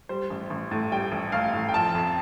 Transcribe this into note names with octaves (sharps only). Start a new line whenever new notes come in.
G3 C5
A1
A1
A2
G3 G5
A1
A1 F5
A2
G5
F3 A5
F2